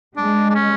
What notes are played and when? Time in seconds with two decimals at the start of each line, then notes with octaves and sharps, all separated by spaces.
0.17 G#3 D4
0.50 D4
0.55 C#4